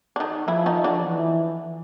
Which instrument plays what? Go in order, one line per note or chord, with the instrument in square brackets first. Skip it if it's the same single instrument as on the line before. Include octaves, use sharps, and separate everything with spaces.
[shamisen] D4
D#3 D#4
[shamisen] E3 E4 [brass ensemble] F3
[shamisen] D#3 D#4
D3 D4
[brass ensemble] E3